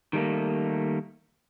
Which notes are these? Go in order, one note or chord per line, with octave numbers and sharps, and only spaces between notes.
D#3 G3 A3 A#3